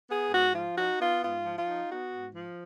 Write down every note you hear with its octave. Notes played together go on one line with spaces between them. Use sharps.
B3 G#4
G#2 F#4
F3 F4
D#4 F#4
B3 F4
G#2 F4
F3
F4
D#4
B3 F#4
G#2
F3